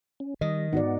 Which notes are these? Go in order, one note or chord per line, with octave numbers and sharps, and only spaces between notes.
C#4
D#3 G3 D#5
G#2 B3 D#4 F#4 D5 F#5